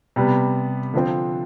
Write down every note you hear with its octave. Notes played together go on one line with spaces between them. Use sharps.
C3 G3 B3
D3 F3 C4